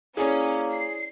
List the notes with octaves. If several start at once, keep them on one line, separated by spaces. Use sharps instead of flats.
A#3 C#4 E4 G#4 C#5 D5
C7